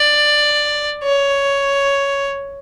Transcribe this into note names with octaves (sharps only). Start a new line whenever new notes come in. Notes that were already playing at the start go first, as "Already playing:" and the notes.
Already playing: D5
C#5